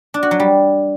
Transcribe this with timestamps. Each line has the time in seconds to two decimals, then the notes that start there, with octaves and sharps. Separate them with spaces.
0.14 D4
0.23 F#4
0.31 F#3
0.40 G3